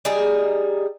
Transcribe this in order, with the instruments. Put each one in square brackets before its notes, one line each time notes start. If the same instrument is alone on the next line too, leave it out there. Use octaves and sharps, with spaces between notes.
[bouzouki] G3 D#4 G#4